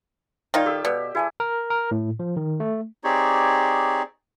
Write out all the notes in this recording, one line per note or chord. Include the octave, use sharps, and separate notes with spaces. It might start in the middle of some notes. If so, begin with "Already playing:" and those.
D#3 D#4 F4 D5 F5 G5
G4 A4 E6
B2 B4 D5
E4 G#4 G#5 A5
A#4
A#4
A2
F3
D#3
A3
C4 D#4 G4 G#4 C#5 D5